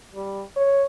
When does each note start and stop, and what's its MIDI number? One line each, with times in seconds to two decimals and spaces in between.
0.15 0.42 55
0.56 0.84 73